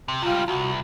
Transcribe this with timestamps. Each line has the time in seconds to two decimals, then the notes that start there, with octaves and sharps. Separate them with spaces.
0.08 C3
0.22 C#2 G3 F4
0.48 C2 F#4